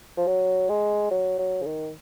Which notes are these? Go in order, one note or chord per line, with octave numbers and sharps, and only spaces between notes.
F3
F#3
G#3
F#3
F#3
C#3
D#3